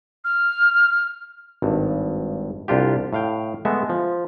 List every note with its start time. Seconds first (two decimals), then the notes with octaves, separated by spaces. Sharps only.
0.24 F6
1.62 G#1 G2
2.68 C2 D4 F4 G4
3.13 A2 F5 G5
3.65 G#3 A3 B3 E5
3.89 F3